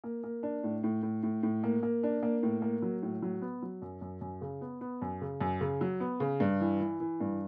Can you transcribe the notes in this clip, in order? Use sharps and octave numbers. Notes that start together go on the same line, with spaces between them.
A#3
A#3
D4
A2
A2
A2
A2
A2
A#3
A#3
D4
A#3
A2
A#3
F#3
A2
F#3
B3
F#3
F#2
F#2
F#2
C#3
B3
B3
F#2
C#3
F#2
C#3
F#3
B3
C#3
G2
E3
E3
E3
G2